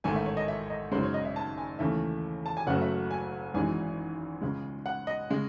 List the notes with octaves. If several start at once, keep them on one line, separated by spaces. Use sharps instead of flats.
A1 G#2 D#3 A3 G#5
E5
C#5
D#5
E5
D#5
G#1 F#2 C#3 G#3 C5
C#5
D#5
E5
A5
G#5
D#2 C#3 E3 A3 E5
A5
G#5
F#1 F#2 C#3 F#3 A3 F#5
E5
G#5
G#1 F#2 E3 G#3 G#5
C#2 C#3 G#3
F#5
D#5
C#3 G#3